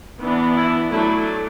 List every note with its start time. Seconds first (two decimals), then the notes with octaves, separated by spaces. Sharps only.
0.21 E3 B3 D4
0.55 E4
0.91 F#3 A3 D4 E4